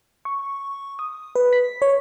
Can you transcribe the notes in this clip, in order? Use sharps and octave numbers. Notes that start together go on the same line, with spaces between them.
C#6
D#6
B4
B6
C#5